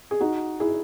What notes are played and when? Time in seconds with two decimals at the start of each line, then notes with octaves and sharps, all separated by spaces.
0.11 G#4
0.21 D#4 F#4
0.60 E4 G#4